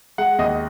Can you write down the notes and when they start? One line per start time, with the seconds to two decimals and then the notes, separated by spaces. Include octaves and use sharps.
0.18 G#3 F#5
0.38 D#2 D#5